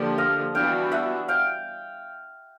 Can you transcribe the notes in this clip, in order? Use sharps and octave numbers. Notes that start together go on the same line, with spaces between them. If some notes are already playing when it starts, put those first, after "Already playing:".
Already playing: D3 F3 A#3 D4 G4
D#5 F5
E3 G3 B3 D4 F#4 F5 G5
E5 F#5
F5 G5